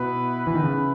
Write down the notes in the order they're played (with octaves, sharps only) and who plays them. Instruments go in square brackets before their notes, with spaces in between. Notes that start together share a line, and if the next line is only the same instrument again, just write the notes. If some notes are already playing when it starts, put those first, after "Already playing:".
Already playing: [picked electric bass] B2 [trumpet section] B3 E4 B4 E5
[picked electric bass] E3
D#3
C#3